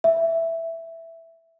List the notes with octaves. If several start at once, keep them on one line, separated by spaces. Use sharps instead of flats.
E5